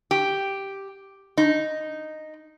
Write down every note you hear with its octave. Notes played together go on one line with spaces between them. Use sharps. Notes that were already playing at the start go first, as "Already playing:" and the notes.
G4
D#4